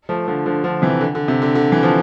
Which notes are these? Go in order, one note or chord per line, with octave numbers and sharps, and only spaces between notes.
F3 A3
D3 F3
D3 F3
D3 F3
C3 E3
D3
D3
C3
D3
D3
E3
F3